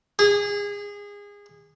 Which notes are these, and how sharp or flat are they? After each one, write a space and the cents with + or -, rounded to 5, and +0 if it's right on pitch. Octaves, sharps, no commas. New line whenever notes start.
G#4 -25